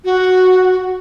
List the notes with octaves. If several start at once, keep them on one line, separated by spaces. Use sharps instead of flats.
F#4